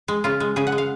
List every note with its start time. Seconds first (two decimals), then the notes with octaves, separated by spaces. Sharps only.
0.08 G#3
0.24 C#3 F4
0.40 G#3
0.56 C#3 G#4
0.67 F#5
0.72 G#3
0.78 F5